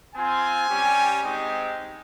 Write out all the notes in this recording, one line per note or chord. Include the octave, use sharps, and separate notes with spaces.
C4 F4 G#5
G3 C#4 G4
G#3 C4 D#4 G4